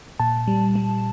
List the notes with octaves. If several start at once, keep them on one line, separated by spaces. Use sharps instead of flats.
A#2 A5
G3
G3